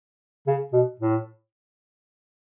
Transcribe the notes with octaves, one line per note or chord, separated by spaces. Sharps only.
C#3
B2
A2